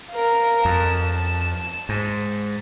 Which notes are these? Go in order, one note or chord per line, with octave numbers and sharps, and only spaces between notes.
A#4 F5
F2 A5
G#2